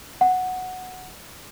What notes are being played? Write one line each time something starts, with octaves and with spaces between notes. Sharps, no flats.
F#5